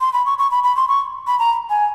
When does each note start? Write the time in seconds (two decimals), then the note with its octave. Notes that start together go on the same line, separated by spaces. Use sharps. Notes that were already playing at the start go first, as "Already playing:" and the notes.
0.01 C6
0.13 B5
0.26 C#6
0.38 C#6
0.51 B5
0.64 B5
0.76 C6
0.89 C#6
1.27 B5
1.39 A#5
1.70 G#5